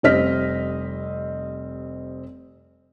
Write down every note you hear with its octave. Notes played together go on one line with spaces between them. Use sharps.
F1 G3 C4 D#5 F6 B6